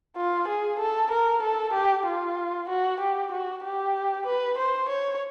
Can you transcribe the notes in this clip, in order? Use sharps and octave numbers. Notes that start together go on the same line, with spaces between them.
F4
G#4
A4
A#4
A4
G4
F4
F#4
G4
F#4
G4
B4
C5
C#5